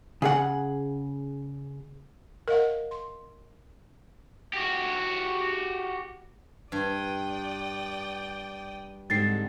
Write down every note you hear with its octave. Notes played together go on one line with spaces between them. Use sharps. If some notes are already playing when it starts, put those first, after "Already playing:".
C#3 G#4 F#5
A#4 D#5 F5 F#5
C6
F#4 G4
G2 D5 G5 D#6
G#2 D3 G3 C4 A6 C7